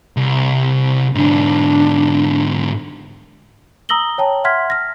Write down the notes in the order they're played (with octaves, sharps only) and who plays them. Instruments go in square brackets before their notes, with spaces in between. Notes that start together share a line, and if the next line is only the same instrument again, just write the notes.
[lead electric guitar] C2
[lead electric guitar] G#2 D3 [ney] D4
[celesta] A#5 D#6 E6 A#6 F#7 G7
C#5 G5 A5 A#5
E5 F#5 C6 F6 G#6 B6
F6 A#6